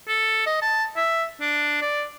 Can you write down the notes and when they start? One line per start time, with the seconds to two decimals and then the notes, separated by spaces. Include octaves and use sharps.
0.08 A4
0.46 D#5
0.62 A5
0.96 E5
1.41 D4
1.81 D5